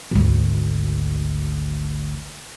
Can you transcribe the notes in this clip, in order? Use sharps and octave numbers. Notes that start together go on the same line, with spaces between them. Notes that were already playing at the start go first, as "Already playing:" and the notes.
G#1 D2